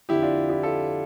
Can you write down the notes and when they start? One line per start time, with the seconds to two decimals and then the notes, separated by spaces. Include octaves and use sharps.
0.09 F2 D3 F3 E4 G4
0.22 D4 F4
0.50 E4 G4
0.63 F4 A4